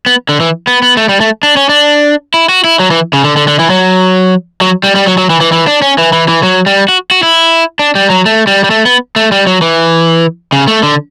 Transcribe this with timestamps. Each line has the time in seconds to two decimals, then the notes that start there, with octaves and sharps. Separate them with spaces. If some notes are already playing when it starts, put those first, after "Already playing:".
0.06 B3
0.29 D3
0.40 E3
0.67 B3
0.82 B3
0.97 A3
1.09 G3
1.21 A3
1.43 D4
1.57 C#4
1.69 D4
2.34 E4
2.49 F#4
2.64 E4
2.80 F#3
2.91 E3
3.13 C#3
3.24 D3
3.37 D3
3.48 D3
3.59 E3
3.70 F#3
4.61 F#3
4.83 G3
4.95 G3
5.07 F#3
5.18 F#3
5.30 E3
5.41 E3
5.52 E3
5.67 D4
5.82 C#4
5.98 E3
6.13 E3
6.28 E3
6.43 F#3
6.66 G3
6.88 F#4
7.11 F#4
7.23 E4
7.79 D4
7.95 G3
8.10 F#3
8.26 A3
8.47 G3
8.64 G3
8.70 A3
8.85 B3
9.16 A3
9.32 G3
9.47 F#3
9.62 E3
10.52 C#3
10.68 A3
10.83 D3